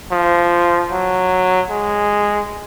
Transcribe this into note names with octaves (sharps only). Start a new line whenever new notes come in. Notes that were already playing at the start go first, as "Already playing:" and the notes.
F3
F#3
G#3